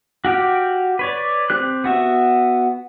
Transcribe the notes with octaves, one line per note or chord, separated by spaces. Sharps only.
F#4 G4 F5 G5
B4 C#5 D5
C4 G4 F#6
B3 F#4 E5